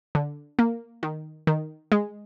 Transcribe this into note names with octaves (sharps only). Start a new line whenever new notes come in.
D3
A#3
D#3
D#3
G#3